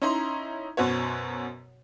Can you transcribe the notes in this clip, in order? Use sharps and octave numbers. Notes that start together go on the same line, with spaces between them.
C#4 D#4 E4 A#5 C6
F#2 B2 F#4 C5 C#5